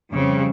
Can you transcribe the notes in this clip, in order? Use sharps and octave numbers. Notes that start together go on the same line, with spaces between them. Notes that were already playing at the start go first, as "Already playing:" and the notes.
F2 C#3 G3 C4